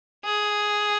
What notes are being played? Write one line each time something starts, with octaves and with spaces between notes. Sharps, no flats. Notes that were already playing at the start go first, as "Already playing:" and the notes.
G#4